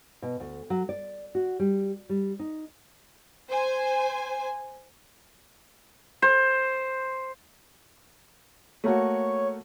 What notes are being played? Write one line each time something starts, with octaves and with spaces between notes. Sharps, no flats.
B2
D2
F#3
D5
F#4
G3
G3
D#4
C5 G#5
C5
A3 A#3 F#4 C#5